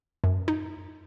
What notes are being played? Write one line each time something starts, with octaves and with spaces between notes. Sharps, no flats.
F#2
D#4